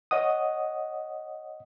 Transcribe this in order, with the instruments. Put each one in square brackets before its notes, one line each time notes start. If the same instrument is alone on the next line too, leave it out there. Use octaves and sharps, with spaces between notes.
[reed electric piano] C#5 D#5 F#5 D#6